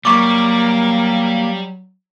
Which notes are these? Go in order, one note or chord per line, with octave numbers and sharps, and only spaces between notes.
F#3 G3 A#3 C#6 D6